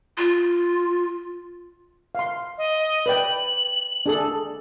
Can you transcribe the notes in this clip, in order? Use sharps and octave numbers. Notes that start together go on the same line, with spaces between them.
F4
F5 C6
D#5
B4 D5 G5 F#7
D4 G#4 A4